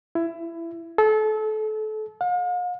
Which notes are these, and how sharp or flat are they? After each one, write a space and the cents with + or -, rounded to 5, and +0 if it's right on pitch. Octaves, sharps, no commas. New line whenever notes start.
E4 +20
A4 -30
F5 +45